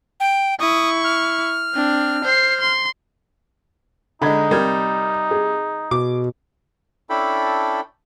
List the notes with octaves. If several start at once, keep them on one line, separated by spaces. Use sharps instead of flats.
G5
E4 C#6 D#6
F6
C4 D4
C5 C7
C6
D3 G#3 D#4 A#5 B5 G#6
C3 G3 A#4 G#6
G#4
B2 D6
C#4 D4 E4 A4 G5 B5